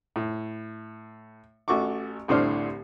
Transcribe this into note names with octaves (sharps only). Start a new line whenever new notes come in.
A2
A1 A3 F#4 C#6 D6
C2 A2 D3 C5 D5 F6